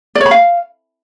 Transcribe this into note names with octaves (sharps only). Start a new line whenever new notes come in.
D5
C#5
B5
F5